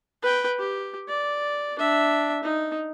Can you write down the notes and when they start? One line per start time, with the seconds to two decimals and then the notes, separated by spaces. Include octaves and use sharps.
0.23 B4 G5
0.59 G4
1.08 D5
1.79 D4 E5
2.44 D#4